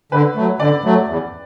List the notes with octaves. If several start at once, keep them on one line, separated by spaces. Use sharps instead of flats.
D3 B4
F#3 A3
D3 D5
F#3 A3
E2